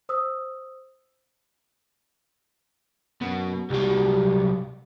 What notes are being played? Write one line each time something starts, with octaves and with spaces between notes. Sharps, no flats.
C5 D#6 E6
F#2 B2
C2 F#3 G3